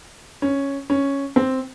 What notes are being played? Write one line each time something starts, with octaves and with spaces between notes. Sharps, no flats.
C#4
C#4
C4